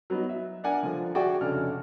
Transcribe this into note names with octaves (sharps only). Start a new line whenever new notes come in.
F#3 B3 D#4
E5
D4 A#4 F#5 G#5
D3 F3
F#4 G#4 D5 E5 G5
F1 C#3 D4 A4 F6